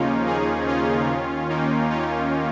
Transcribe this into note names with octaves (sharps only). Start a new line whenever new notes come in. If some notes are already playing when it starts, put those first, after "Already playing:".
Already playing: D#2 C#3 F3 A#3 C#4 D#4 F4
D#4 G#4
C#4 F4
D#2 D#3
A#3 D#4
C#4 F4